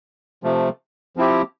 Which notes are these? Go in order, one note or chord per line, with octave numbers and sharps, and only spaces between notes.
C3 F3 A3
F3 C4 E4 G4